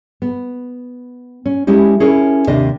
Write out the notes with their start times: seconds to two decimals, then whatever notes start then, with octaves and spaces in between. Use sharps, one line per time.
0.22 B3
1.46 C#4
1.67 G#3 C#4 E4 G4
2.00 C#4 E4 G#4 A#4
2.47 D#2 C3 D4 D#5